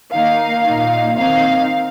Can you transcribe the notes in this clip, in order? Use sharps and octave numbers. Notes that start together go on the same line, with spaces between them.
D#3 A#3 D#4 F5
A#2 A#3 D#4
D#3 C4 D#4 F5